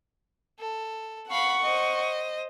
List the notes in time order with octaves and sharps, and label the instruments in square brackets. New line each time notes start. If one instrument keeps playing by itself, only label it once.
[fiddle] A4
[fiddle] F5 B5 [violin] F#5 C#6
[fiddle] C5 D#5